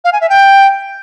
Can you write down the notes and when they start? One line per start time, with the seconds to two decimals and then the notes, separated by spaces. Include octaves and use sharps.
0.05 F5
0.13 G#5
0.21 E5
0.30 G5